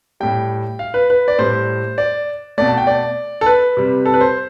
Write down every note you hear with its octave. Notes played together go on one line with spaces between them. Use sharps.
A2 G3 G5
F5
B4
B4
D5
A2 G3 C5
D5
B2 A3 D5
A5
G5
D5
A4
B4
C3 G3
A4
B4
C5